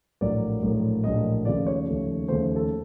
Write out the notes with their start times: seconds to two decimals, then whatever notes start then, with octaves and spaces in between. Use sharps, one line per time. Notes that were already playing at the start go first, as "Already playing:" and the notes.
0.21 A#1 A2 F#3 A#3 D5
0.62 A#1 A2 F#3 A#3
1.04 A#1 A2 F#3 A#3 D#5
1.45 D#2 C#3 F3 A3 D5
1.67 C#5
1.86 D#2 C#3 F3 A3
2.28 D#2 C#3 F3 A3 C5
2.56 A4